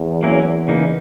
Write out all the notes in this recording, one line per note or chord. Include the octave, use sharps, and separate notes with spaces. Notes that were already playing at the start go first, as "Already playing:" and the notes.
Already playing: E2
F#3 A#3 C#4 E4 A#4
C#3 E3 A#3 D#4